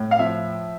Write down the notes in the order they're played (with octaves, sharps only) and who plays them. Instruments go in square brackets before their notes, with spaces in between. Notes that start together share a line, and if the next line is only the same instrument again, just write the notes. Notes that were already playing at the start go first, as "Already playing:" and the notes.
Already playing: [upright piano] A2
F5
F3 E5